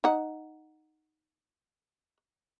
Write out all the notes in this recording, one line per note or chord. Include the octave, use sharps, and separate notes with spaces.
D#4 F#5